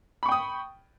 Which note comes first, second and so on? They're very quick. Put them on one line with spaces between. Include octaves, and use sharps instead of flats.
B5 C#6 G5 D#6